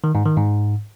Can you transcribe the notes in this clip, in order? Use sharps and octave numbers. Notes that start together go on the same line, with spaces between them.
D#3
G#2
D#3
G#2